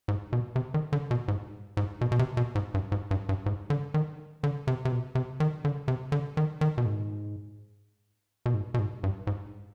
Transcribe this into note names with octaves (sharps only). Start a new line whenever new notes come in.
G#2
B2
C3
D#3
D3
B2
G#2
G#2
B2
B2
C3
B2
G#2
G2
G#2
G2
G2
G#2
D3
D#3
D3
C3
C3
B2
C3
D#3
D3
C3
D3
D#3
D#3
B2
G#2
B2
G#2
B2
G#2
G2
G#2